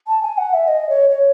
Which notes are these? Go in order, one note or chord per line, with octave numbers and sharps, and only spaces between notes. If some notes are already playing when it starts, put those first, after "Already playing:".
A5
G#5
F#5
E5
D#5
C#5
C#5